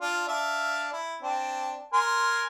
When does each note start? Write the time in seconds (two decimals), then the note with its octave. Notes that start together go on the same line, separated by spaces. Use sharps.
0.01 D4 F4
0.28 D4 E5 F5
0.93 E4
1.23 C4 D4
1.93 A#4 G#5 C6